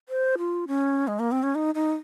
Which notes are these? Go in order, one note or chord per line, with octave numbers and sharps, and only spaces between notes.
C5
F4
C#4
G#3
A#3
C4
C#4
D#4
D#4